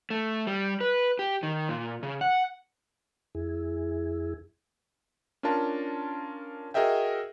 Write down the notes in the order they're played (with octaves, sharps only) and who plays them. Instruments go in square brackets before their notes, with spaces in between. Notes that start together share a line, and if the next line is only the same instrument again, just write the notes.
[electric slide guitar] A3
G3
B4
G4
D#3
A#2
C#3
F#5
[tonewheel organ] F2 E4 G#4
[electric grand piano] C#4 D4 F4 A#4 A5
F#4 G#4 A#4 D#5 E5 G5